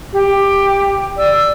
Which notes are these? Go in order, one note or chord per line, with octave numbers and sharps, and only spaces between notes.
G4
D5 E6